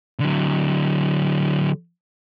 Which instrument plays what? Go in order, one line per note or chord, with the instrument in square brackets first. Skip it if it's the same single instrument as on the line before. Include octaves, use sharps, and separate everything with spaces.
[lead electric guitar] D3 F#3